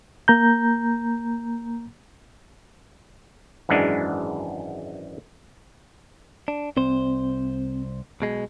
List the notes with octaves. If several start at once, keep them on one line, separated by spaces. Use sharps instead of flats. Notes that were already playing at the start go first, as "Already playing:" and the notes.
A#3 A#5 G6
G#1 F#2 E3 G#3 D4
D4
C2 C4 C5
B1 B2 G#3